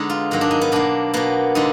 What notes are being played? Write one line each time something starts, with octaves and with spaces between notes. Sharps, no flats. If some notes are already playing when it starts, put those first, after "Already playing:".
Already playing: D3 G#3 B3 D#4 G#4
F4
G#2 D#3 F#3 A#3
D4
D#4
B3
B2 A#3 D4
B2 A#3 B3
D3 G#3 D#4